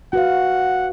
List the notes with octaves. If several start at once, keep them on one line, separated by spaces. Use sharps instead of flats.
F#4 B4 F5 F#5